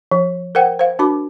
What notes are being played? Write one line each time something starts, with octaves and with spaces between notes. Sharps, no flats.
F3
A#4 C5 F#5 G5
C5 F5
D4 F#4 A#4 B5 D6